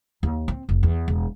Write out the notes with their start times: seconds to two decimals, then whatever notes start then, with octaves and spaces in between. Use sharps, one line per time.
0.23 D#2
0.48 C4
0.69 F1
0.83 E2
1.08 E1